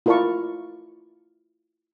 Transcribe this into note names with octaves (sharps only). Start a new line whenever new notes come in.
E4 F4 A#4 D5 A5 C#6